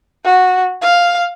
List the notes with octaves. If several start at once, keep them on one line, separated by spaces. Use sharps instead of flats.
F#4
F5